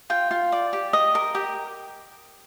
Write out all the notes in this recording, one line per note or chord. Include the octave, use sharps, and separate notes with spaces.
F4 G5
F4
D5
G4
D#5
A#4
G4